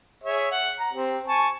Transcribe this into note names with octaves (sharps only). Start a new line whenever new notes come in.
G#4 C#5 E5
F#5
A#5
C4 G4
G#5 A5 C#6